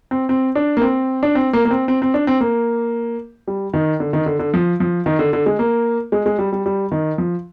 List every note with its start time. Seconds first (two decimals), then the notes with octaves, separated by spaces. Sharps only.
0.11 C4
0.29 C4
0.55 D4
0.77 A#3
0.82 C4
1.23 D4
1.35 C4
1.53 A#3
1.65 A#3
1.71 C4
1.88 C4
2.02 C4
2.14 D4
2.27 C4
2.41 A#3
3.47 G3
3.74 D#3
4.00 D3
4.13 D#3
4.26 D3
4.39 D3
4.54 F3
4.80 F3
5.06 D#3
5.19 D3
5.33 D3
5.46 G#3
5.59 A#3
6.12 G#3
6.26 G#3
6.39 G3
6.52 G3
6.66 G3
6.92 D#3
7.18 F3